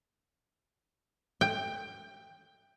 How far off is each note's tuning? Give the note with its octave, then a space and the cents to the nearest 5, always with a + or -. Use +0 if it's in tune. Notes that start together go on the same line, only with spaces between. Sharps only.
G5 +15